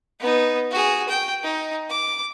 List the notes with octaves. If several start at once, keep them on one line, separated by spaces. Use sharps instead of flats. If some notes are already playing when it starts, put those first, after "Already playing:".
B3 D#4
F#4 G#4
G5
D#4
D6